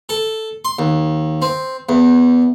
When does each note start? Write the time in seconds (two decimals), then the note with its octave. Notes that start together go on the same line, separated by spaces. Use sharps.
0.09 A4
0.65 C6
0.79 D#2
1.42 C4
1.89 E2